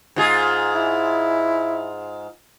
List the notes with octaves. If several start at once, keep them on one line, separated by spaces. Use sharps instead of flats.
G#2 F4 G#4
E4